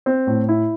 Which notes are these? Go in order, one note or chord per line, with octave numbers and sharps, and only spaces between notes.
C4
A2
E4